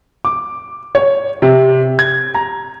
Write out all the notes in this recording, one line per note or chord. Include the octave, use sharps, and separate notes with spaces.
D6
C#5
C3
G#6
A#5